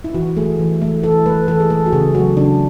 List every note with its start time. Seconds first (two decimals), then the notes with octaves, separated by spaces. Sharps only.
0.04 E4
0.14 E3 F#4
0.37 A3 G#4
0.59 E3
0.82 A3
1.03 E3 A4
1.26 A3 B4
1.48 E3 A4
1.60 G#4
1.70 A3 A4
1.86 F#4
1.92 C#3 G#4
2.15 F#3 A3 F#4
2.37 C#3 D4